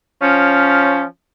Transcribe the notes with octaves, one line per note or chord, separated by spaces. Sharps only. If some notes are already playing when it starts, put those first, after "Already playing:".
F3 C#4